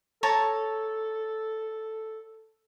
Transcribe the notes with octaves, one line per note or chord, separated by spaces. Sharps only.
A4 C#5 A5 A#5